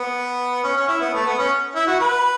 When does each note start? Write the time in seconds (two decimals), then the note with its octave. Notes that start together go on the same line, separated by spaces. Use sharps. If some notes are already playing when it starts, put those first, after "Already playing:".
Already playing: B3
0.64 C#4
0.76 C#4
0.88 E4
1.01 B3
1.14 A3
1.26 B3
1.39 C#4
1.75 E4
1.87 F#4
2.00 B4